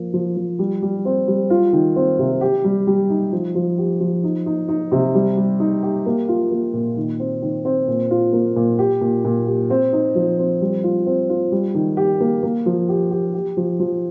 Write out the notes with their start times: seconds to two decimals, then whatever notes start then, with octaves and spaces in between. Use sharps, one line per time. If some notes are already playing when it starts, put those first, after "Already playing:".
Already playing: F3 A#3
0.14 F3
0.37 F3
0.59 G3
0.82 G3
1.05 C4
1.27 G3
1.50 F4
1.73 D#3
1.96 C4
2.19 C3
2.41 G4
2.64 G3
2.87 G3
3.10 D#4
3.33 F3
3.55 F3
3.78 G4
4.00 F3
4.24 D#4
4.46 D#4
4.69 D#4
4.92 C3
5.15 G3
5.37 G3
5.60 D#4
5.83 G4
6.06 A#3
6.28 F4
6.51 A#3
6.74 A#2
6.97 D#3
7.19 C4
7.42 D#3
7.65 C4
7.88 A#2
8.11 F4
8.33 A#3
8.56 A#2
8.79 G4
9.01 A#2
9.25 A#2
9.47 G4
9.70 C4
9.93 D#4
10.15 F3
10.39 C4
10.61 G3
10.84 F4
11.06 C4
11.29 F4
11.52 G3
11.75 D#3
11.97 G4
12.20 A#3
12.43 A#3
12.66 F3
12.89 G4
13.11 G4
13.34 G4
13.57 F3
13.80 F3